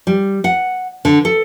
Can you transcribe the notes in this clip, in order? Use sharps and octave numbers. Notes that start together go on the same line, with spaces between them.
G3
F#5
D3
A4